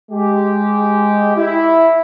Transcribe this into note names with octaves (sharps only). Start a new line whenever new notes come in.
G#3 G4
E4